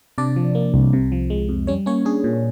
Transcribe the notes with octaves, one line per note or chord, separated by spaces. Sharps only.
C3 D4 D5
F3
A#3
C2
C3
F3
G#3
F2
G3 C#4 C#5
A#3 C#4 C#5
D4 G#4
A#2